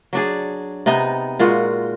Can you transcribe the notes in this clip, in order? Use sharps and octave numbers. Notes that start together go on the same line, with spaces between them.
F#3 D4 G#4
C3 B3 D#4 D#5
A#2 G#3 F4 F#4